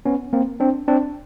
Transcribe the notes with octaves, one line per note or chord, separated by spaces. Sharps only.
B3 C#4
A#3 C4
C4 D4
C4 D4